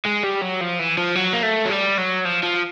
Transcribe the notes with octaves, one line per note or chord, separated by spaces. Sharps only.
G#3
G3
F#3
F3
E3
F3
F#3
A#3
A3
F#3
G3
F#3
F3
F3